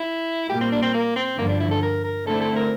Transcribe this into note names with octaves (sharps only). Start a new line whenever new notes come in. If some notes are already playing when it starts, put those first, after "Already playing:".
Already playing: E4
A#2 G3 A#3 G4
C4
D4
C4
A#3
C4
G2 D3 F3 A#3
D4
E4
A4
A#4
A#4
D3 A3 C4 E4 A4
A4
A#4